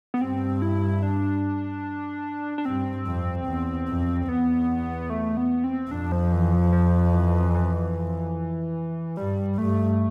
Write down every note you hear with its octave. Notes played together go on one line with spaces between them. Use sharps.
B3
G2 C4
E4
D4
D4
G2 C4
F2
E2
F2
E2 B3
A3
B3
C4
F2 D4
F3
E3
F3
F3
E3
E3
G2 G3
G2 A3